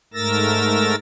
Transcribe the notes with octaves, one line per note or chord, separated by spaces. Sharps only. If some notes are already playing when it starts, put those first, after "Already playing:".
G#2 A3 A#4 E6 A6 A#6